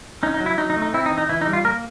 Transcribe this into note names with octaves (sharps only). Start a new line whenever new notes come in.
C#4 D#4
D#4
F#3
E4
F#3 D#4
D#4
A3
D#4
C4 E4
D#4
E3
D#4
E3 E4
D#4
G3
F4
A#3 A#4